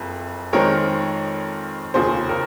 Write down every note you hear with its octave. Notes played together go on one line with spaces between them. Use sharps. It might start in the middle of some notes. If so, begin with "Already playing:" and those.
Already playing: F#1 F2
F2 D#3 G#3 C4 A#4 C#5
F1 D#2 C#3 F3 G#4 C5
A#4